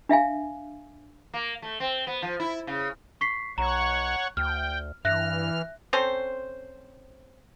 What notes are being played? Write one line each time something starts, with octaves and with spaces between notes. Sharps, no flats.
D4 E5 F5 G#5
A#3
A3
C4
B3
F3
E4
C#3
C#6 B6 C7
B1 C#5 F#5 A#5 C#6
D2 G5 F6
G2 E3 E5 F6 F#6 A#6
C4 C#4 A4 C5